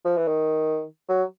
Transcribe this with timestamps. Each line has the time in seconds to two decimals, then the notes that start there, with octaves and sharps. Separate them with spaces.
0.05 F3
0.17 E3
0.27 D#3
1.09 F#3